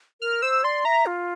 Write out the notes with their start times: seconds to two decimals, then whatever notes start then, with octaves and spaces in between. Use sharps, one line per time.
0.21 A#4 F6
0.42 C5 E6
0.64 D5 C6
0.85 E5 A#5
1.06 F4